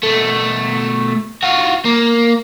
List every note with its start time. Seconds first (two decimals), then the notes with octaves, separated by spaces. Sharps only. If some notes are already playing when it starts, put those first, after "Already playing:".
0.03 B2 A3
1.43 F4 F#4
1.85 A#3